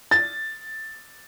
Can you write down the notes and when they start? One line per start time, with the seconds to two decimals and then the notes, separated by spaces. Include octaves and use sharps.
0.11 A6